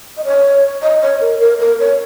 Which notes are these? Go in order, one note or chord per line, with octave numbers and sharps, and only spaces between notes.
D#5
C#5
D#5
C#5
A#4
A#4
A#4
C#5